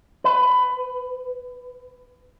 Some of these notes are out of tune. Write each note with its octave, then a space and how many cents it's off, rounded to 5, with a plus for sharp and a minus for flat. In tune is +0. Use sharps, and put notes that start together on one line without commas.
B4 +20